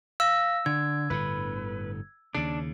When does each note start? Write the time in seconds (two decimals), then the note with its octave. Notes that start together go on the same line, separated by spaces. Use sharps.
0.20 F5 E6 A#6
0.66 D3 G#6
1.10 G1 A2 D3 B4
2.35 D#2 C#3 D4